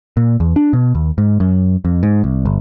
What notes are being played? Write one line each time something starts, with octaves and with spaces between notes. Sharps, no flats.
A#2
E2
D4
B2
D#2
G#2
F#2
F2
G#2
C2
G1